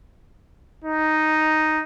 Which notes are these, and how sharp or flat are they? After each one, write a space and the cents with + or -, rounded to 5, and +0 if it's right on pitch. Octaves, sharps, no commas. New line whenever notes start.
D#4 +0